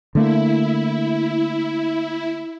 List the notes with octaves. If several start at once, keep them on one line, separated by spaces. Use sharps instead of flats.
D3 A3 A#3 E4